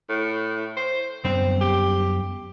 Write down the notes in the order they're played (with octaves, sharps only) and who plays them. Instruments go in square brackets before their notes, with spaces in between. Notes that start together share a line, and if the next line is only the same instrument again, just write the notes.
[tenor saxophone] A2
C5
[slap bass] F#2 G3 B3 [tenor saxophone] C4
[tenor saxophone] G4